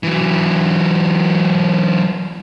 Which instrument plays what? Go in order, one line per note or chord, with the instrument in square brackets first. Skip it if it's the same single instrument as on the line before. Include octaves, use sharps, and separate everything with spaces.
[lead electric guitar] E3 F#3